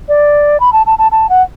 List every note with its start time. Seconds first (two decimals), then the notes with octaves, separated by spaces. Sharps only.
0.09 D5
0.60 B5
0.73 A5
0.86 A5
0.99 A5
1.12 A5
1.29 F#5